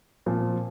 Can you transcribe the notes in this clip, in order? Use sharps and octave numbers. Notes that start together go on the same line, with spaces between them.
A#2 F3 C4